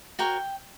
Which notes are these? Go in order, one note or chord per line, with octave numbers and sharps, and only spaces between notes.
F#4 A#4 C#5 G5